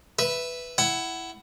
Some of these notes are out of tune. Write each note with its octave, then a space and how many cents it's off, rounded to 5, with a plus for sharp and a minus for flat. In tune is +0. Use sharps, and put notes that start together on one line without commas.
B4 +0 E5 +0
E4 +5 F#5 +20